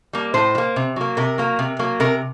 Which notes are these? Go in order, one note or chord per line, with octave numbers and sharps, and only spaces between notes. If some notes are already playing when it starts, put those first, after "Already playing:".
G3 A#3
A2 C5
G3
A#3
C3
F#3 A#3
C3 A#4
F#3 A#3
C3
F#3 A#3
C3 A#4